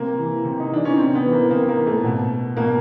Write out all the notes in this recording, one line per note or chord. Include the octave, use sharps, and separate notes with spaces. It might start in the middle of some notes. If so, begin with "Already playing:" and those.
Already playing: C3 A#3
E3
C3
D#4
E3 D4
C#4
C3 C4
B3
E3
A#3
C3 A#3
A#3
E3
A3
B2
B2 A#3